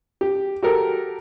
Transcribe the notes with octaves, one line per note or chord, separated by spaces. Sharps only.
G4
F#4 G4 A4 A#4